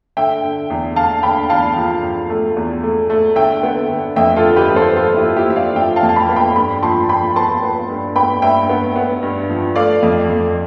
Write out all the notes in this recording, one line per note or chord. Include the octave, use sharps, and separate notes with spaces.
D3 E5 G5
D3
E2
D3 F5 A5
D3 G5 B5
E2 F5 A5
F3
F3
A3
E2
A3
A3
D3 E5 G5
B3
D3
F2 E5 G5
F4 A4
D3
G4 B4
F3
A4 C5
F3 F4 A4
E4 G4
F3
E4 G4
F3 E5
D5 F5
F3 E5 G5
F5 A5
F2
A5
G5 B5
B3
G5 B5
G2 G5 B5
F3 A5 C6
F3 G5 B5
B3 A5 C6
B3
G2
B3 G5 B5
G2 E5 G5
B3
B3
G2
F3
A3 D5 F5
F2
F2